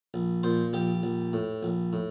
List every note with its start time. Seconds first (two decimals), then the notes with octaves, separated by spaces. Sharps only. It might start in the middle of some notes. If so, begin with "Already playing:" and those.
0.14 A#1
0.43 A#2 C5
0.73 A#1 G4
1.03 A#1
1.33 A2
1.63 A#1
1.93 A2